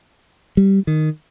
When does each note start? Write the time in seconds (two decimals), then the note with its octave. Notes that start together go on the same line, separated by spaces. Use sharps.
0.57 G3
0.87 D#3